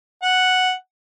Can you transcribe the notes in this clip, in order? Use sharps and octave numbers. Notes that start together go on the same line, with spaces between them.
F#5